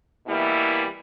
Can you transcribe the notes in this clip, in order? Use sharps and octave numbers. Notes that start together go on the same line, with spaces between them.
B2 E3 G3 A#3 E4